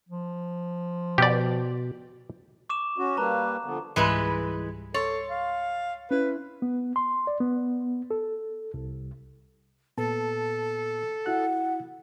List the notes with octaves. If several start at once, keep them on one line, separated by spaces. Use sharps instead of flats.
F3
B2 G4 D5
C#6 D6 E7
C#4 F#4
G3 A#3 B4 A5 A#5
D3 F3 B3
C#2 G#2 E3 G3 G#3 B4
A4 C#5 C6 A6
F5
C#4 E4 B4
B3
C6
D5
B3
A4
C2
A#2 B3 A4 A5
E4 F#4 F#5 F#6